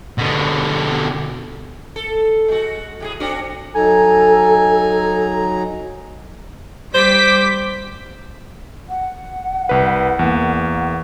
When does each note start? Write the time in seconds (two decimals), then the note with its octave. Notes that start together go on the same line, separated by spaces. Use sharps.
0.18 B2 D3
1.96 A4
2.48 G#3 F#4
3.00 A2 G4 G#4
3.20 C4 D4 F#4
3.75 F#3 D#4 A4 G#5 A#5
6.94 G3 C5 D6 B6
8.89 F#5
9.69 C2 B4
10.19 E2 A#3